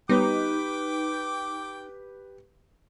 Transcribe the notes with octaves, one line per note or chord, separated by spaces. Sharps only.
G3 B3 D#4 G4 B4 C#5 G5 D6